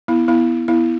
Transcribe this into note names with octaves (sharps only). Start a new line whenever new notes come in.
B3 E4
B3 E4
B3 E4